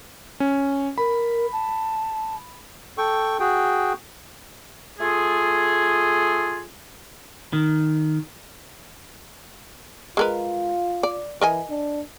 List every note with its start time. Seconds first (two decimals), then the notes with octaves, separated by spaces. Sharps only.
0.40 C#4
0.98 A#4 B5
1.52 A5
2.98 A4 G5 C#6
3.40 F#4 G#4 G5
5.00 A3 F4 G#4
7.53 D#3
10.17 G#3 F4 A#4 B4
11.03 D5
11.41 E3 A#4 D#5 G#5
11.70 D4